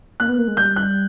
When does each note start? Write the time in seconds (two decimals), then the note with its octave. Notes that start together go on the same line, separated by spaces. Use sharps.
0.20 A#3 F#6
0.29 B3
0.38 A#3
0.48 G#3
0.57 G3 G6
0.76 F#6